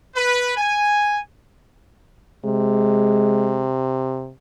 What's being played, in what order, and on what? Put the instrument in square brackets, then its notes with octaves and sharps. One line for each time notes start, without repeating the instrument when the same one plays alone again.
[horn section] B4
G#5
[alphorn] C3 [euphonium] G#3